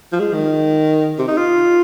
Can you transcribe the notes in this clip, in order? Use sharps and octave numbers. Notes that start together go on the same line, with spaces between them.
F3
G#3
D#3
C3
D#4
F4